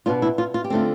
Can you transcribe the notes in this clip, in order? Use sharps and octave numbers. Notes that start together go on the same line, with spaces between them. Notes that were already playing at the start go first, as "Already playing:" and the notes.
B2 B3 D4 F4
E4
F4
F4
G4
D3 A3 C4 F4